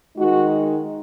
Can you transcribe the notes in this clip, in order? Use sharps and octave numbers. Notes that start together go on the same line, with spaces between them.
D#3 G#3 D#4 F#4